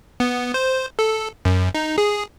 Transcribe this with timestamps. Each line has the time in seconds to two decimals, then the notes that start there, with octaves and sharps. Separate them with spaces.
0.20 B3
0.54 C5
0.99 A4
1.45 F#2
1.75 D#4
1.98 G#4